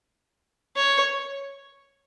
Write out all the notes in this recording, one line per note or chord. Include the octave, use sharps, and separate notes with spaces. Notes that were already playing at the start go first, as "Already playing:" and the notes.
C#5